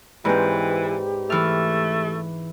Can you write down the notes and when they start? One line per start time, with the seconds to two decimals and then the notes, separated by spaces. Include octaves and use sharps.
0.25 G#2 E3 C4 G4 B4 D5 B5
1.30 E3 A3 F6